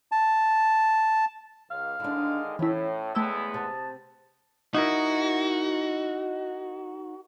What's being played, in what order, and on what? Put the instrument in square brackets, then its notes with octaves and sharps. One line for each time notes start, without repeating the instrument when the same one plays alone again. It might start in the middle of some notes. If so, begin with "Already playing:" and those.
[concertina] A5
[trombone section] C#2 [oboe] F5
[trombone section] D3 D#3 G#3 [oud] D4 E4
[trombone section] A2 [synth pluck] E3 E4 [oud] C#4
[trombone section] E2 G#3 B3 [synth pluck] A3 G5 E6 [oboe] E4
[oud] C3 [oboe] A5
[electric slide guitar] D#4 E4 A#4 [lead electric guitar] F#4